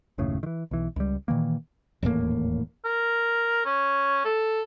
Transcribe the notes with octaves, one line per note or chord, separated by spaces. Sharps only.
F#1 D#2 A2 C#3
D#3 E3
B1 E3
C#2 G3
A#2 D#3 E3 A#3
D#1 E2 A2 A#3
A#4
C#4
A4